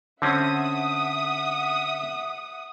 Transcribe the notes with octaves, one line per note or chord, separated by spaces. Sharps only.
D3 C4 C#4 E5 F#5 D#6